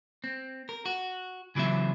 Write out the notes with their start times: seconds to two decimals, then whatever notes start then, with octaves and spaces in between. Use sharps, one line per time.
0.24 C4
0.69 A#4
0.86 F#4
1.55 C#3 E3 F#3 C4 E5